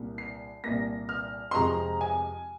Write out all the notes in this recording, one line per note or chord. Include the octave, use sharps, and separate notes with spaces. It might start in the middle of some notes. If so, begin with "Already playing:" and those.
Already playing: C2 A#2 A#3
C7
C2 A#2 A#3 A#6
F6
C6
F2 C3 F3 G#3 C4 A#5
G#5